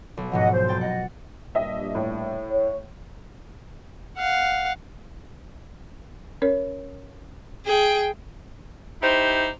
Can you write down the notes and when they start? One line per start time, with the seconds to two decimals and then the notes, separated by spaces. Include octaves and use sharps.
0.17 B1
0.32 G#2 B2 F3 D#5 F#5
0.51 C5
0.68 F1 G5 A6
0.81 D#5 F#5
1.55 G2 A#2 D#5 E5
1.95 A2
2.50 C#5
4.17 F5 F#5
6.42 C#4 A#4 C#5
7.65 G#4 G5
9.01 D#4 E4 G4 C5